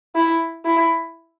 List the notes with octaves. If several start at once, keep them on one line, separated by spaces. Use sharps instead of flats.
E4
E4